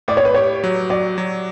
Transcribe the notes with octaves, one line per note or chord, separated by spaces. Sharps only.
A2 D5
C#5
B4
G4 C#5
F#3
F#3 D5
F#3